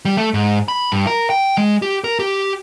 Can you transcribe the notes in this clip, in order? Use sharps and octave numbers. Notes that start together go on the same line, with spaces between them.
G3
A3
G#2
B5
G2
A#4
G5
G#3
G4
A#4
G4